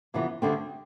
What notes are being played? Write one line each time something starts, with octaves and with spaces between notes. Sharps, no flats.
F2 C3 E3 B3
D2 D3 G3 C4